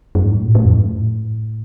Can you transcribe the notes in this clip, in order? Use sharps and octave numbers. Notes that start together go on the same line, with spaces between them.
F#2
G#2
A2
A#2
A2
F2
G#2
A2